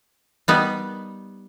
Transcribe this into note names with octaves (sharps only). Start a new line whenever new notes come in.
G3 B3 D#4